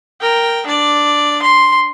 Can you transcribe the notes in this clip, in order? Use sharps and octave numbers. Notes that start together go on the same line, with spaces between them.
A#4 G5
D4 D5
C6